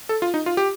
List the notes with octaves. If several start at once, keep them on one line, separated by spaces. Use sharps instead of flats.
A4
F4
D#4
F4
G4